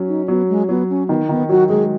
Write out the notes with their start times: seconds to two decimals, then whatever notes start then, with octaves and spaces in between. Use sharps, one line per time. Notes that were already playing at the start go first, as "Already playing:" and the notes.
Already playing: F#3 C#4
0.08 D#4
0.28 F#3 B3
0.49 G#3
0.69 F#3 B3
0.90 C#4
1.09 D#3 B3
1.29 D#3 B3
1.49 F#3 F#4
1.69 G#3 G#4